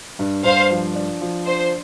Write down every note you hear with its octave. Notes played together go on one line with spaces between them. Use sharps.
G2
G2 C5 F5
F3
D4
F3
D4 C5